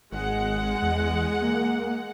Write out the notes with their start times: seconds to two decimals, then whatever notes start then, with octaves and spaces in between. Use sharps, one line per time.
0.12 G#1 G#3 F#5
0.82 E2
1.42 A#3